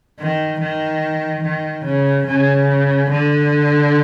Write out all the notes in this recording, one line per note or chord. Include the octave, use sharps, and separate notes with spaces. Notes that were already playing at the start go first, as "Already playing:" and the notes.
D#3
D#3
D#3
C#3
C#3
D3